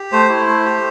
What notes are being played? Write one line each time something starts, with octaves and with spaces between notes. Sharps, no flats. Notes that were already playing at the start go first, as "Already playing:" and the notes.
Already playing: G4
A3 C5
E4
A3
G4